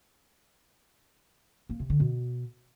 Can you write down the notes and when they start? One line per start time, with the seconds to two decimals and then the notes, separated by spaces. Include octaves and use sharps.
1.69 A#3
1.80 C3
1.90 D3
2.00 B2